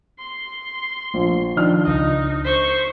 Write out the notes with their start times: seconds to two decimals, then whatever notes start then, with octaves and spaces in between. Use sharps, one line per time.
0.19 C6
1.14 A#1
1.57 D#3 F3 D4 F6
1.85 C#2 D#4 D#5
2.44 C5 C#6 B6